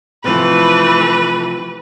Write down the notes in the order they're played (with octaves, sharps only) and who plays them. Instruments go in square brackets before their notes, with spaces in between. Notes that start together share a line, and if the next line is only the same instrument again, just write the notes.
[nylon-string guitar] C3 F3 [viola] E3 A3 [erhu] B4